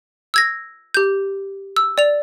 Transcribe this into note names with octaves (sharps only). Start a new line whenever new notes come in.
E6 G#6 A#6
G4 G6
E6
D5 F7